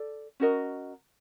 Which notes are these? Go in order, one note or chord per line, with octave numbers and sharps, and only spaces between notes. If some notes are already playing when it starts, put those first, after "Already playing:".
Already playing: A4 D5
C#4 F#4 A#4 D#5